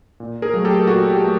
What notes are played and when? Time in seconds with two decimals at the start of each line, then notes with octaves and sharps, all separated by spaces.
0.20 A#2
0.42 G#4 A#4
0.54 F#3 A3
0.65 G4 A4
0.87 A#2 F#4 G#4
1.10 G4
1.21 F#3 A3